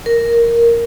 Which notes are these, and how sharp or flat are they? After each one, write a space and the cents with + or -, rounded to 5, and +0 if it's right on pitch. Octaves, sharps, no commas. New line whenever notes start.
A#4 +0